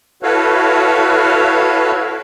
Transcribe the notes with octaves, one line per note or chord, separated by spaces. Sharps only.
E4 F#4 A4 B4 C#5 F5